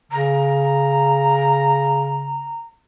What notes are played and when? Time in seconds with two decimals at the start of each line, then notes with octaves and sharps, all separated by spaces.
0.12 C#3 A#5